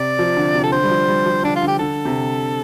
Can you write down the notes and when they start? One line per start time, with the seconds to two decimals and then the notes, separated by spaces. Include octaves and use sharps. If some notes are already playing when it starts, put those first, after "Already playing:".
Already playing: C3 D5
0.19 F3
0.37 D3
0.54 C3
0.63 A4
0.72 D3 C5
0.84 G3
0.90 F3
1.08 G3
1.26 F3
1.43 D3 D4
1.56 F4
1.62 D3
1.67 G4
1.79 D3 A4
2.05 C3